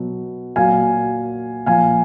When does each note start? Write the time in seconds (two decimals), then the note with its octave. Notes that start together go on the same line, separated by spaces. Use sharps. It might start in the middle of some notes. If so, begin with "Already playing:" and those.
Already playing: B2 F#3
0.56 A#2 F#3 F5 G#5
1.66 A#2 F3 F5 G#5